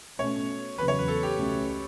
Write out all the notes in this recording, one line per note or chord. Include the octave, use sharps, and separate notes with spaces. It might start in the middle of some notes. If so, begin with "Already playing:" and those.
B2 A3 C#4 C#5
E2 C#3 F#3 B3 B4
C#5
B4
A4
G4
C#2 B2 A3 C#4